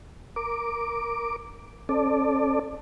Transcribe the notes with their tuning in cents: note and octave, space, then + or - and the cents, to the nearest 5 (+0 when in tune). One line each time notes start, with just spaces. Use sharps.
A#4 +0 D6 +0
C#4 -45 A4 +0 D5 +15